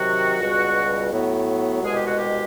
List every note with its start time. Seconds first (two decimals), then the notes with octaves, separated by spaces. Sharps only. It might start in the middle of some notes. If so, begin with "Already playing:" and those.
Already playing: C3 D#3 F#3 F#4
0.40 C#2 B2 G3
1.11 A2 F#3 B3
1.83 C2 B2 G#3 G#4
1.95 G4
2.06 F#4
2.17 G4